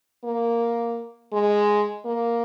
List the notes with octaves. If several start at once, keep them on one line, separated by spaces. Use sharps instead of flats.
A#3
G#3
A#3